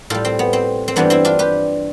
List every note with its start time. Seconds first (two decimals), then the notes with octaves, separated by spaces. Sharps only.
0.10 A2 G3 F4 A4
0.25 C4
0.39 B3
0.53 C4
0.88 C4
0.96 G2 E3 G3 B3 D4
1.10 C4 E4
1.25 D4 F4
1.39 G4 B4